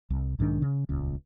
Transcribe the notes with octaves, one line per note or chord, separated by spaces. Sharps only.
C2
B1 G#2 D#3 D4
C#3
D#1 C#2